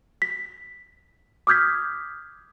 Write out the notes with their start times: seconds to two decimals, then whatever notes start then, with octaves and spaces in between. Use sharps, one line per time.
0.22 B6
1.47 D6 D#6 F6 G6 G#6 B6